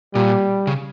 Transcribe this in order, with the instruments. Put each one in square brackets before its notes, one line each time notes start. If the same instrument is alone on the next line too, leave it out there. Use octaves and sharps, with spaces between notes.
[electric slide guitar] A#2 [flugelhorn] G3
[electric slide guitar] C#3